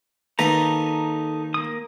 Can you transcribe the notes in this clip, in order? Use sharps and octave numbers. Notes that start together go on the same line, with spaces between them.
D#2 D#4 A4 B4 A#5
A#3 D#6